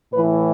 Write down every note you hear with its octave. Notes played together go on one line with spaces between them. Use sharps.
A2 E3 B4